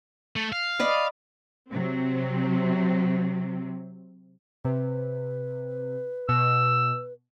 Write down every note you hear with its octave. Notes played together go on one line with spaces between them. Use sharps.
A3
F5
D5 D#5 B5
C3 F#3 C4
C3 B4
B2 E6